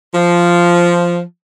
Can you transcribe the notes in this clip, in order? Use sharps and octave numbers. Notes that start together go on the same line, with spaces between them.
F3